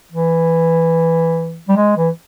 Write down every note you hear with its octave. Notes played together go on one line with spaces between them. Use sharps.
E3
G3
G#3
E3